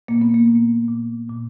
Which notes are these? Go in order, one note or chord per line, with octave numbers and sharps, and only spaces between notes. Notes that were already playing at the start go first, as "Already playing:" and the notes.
A#2 A#3
B3
A#3
A#2
A#2
A#2